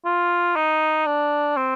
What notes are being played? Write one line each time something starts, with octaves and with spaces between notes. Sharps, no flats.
F4
D#4
D4
C4